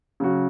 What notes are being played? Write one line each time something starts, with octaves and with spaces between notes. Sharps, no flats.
C#3 F#3 C#4 F#4